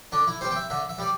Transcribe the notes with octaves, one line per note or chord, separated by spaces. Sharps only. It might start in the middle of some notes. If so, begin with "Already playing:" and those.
D3 D4
E4
G3 C4 C5
G5
E5
D3 E5
E5
G3 D5